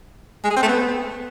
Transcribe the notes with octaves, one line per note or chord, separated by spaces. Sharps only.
G#3
G#4
C4
A3
B3